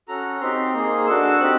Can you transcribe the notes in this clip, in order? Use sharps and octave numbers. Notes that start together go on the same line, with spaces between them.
C#4 F#4 A4 A#5
C4 D#4 G4 C6
A#3 D#4 G#4
D4 F#4 A4 E6
C4 D#4 G4 F#6